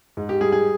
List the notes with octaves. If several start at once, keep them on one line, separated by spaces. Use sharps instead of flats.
G#2
G4
G3 G#4
G#4